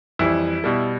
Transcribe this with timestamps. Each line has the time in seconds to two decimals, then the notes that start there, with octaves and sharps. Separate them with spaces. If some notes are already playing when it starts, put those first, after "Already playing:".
0.19 F2 E3 G3 E4
0.64 B2 G3